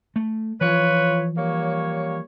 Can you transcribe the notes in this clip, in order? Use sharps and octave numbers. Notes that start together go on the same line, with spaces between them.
A3
E3 F3 F4 B4 C#5
G3 A#3 C#5